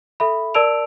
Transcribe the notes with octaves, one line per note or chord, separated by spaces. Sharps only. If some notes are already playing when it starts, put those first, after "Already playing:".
A4 E5 B5
A#4 D5 A5 E6 D7 F7